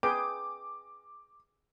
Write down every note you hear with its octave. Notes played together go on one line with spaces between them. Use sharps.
G#4 B4 G5 D6